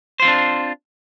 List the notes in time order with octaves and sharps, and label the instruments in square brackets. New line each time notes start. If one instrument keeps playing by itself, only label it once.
[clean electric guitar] C5
F4
C4
D4